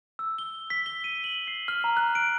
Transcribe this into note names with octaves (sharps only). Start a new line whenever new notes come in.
E6
G7
B6
G7
D#7
F#7
C7
F6
A#5
F#6
D7